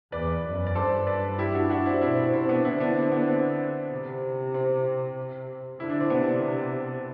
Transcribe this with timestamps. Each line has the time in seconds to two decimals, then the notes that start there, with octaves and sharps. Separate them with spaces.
0.12 E2 B4 D5
0.44 F#2
0.67 D5
0.75 G2 A4 C5
1.07 B4 D5
1.38 E4 G4
1.54 D4 F#4
1.70 D4 F#4
1.86 C4 E4
2.01 B2 C4 E4
2.18 C4
2.33 C3 C4
2.49 B3 D4
2.65 D3 C4 E4
2.80 B3 D4
2.96 C4
3.12 B3
3.28 C4
3.91 C3
4.54 C4
5.80 D3 E4
5.90 D4
6.00 C4
6.10 C3 B3 D4